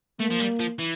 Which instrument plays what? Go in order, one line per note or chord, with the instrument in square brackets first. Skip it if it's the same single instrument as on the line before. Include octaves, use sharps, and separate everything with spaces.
[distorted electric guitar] A3 [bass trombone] A#3
[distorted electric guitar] F3
G3
F3
E3